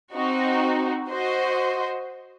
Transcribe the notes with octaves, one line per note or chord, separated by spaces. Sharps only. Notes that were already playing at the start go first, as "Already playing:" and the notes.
C4 D#4 F#4
F#4 C5 D#5